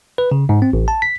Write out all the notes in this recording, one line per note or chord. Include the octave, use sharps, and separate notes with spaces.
B4
C#3
G#2
C4
A1
A5
B6